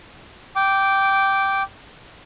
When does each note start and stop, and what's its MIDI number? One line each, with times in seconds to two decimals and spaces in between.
0.56 1.63 79
0.56 1.63 86